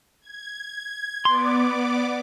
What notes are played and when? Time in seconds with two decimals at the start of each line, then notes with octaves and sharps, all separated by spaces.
0.22 G#6
1.25 B3 D5 C6 D6